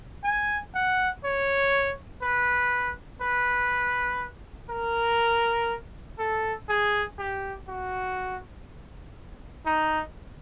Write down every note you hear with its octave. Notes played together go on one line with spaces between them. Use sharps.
G#5
F#5
C#5
B4
B4
A#4
A4
G#4
G4
F#4
D#4